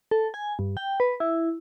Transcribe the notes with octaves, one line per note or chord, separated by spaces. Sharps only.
A4
G#5
G2
G5
B4
E4